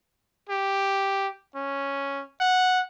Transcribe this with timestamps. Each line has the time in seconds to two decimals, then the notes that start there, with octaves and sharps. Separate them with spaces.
0.49 G4
1.56 C#4
2.40 F#5